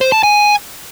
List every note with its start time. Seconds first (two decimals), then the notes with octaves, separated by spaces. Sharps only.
0.01 C5
0.12 A5
0.23 G#5